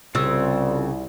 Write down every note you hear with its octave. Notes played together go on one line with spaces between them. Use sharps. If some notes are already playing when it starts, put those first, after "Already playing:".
C2 C#3 C4 F4 E6